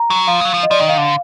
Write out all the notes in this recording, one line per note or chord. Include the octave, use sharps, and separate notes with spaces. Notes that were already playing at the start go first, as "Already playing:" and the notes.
Already playing: A#5
F#3
F3 F5
G#3
F#3
F3
D#5
F3 D5
D#3 D#5
F5
D3